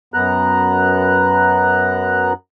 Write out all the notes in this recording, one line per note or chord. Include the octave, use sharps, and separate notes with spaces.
F#2 B3 A#5 F#6